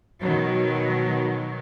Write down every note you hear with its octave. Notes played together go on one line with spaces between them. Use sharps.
B2 D#3 F#3